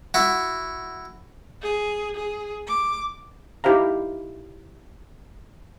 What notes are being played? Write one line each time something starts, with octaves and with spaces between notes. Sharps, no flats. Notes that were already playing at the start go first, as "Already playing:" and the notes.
E4 F#4
G#4
G#4
D6
D#4 E4 G4 C5 F5 A#5